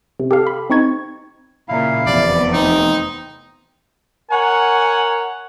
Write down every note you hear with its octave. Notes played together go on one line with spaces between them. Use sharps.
C3
G4 A4 F5
B5
C4 D#4 C#6 G#6
A#2 C#3 E4 F5
F1 E2 B3 D5
C4 D#4
A#4 C#5 F#5 G#5